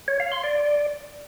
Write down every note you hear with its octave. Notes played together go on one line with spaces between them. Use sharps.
C#5
F5
C6
D5